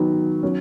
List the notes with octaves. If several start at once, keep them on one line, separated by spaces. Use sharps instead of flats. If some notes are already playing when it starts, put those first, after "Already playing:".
Already playing: D#3 F#3 B3 D#4
F#3 C#4